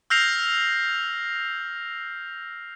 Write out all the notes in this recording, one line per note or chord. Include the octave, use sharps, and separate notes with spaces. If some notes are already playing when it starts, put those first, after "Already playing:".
E6 F6 G6 A#6 C7 F7